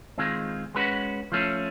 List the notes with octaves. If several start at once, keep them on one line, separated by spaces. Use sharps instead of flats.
D#3 G#3 C4 F4 G#4
G#3 C#4 F#4 B4
F3 A3 C#4